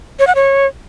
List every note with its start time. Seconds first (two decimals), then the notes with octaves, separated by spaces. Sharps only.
0.19 C#5
0.27 F#5
0.35 C#5